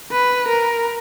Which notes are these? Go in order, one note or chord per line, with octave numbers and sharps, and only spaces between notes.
B4
A#4